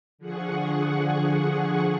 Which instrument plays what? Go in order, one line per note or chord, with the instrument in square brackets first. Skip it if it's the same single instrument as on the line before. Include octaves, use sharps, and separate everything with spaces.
[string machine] D3 F3 G#4 F#5 C#6